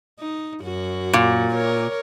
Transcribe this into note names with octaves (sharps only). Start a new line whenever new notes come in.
D#4
F#2 F#4
A#2
A#4 C#5